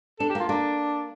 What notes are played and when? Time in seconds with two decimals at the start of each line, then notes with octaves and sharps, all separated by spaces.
0.19 D4 A4
0.29 G4
0.35 A#3
0.40 F4
0.49 A#3 D4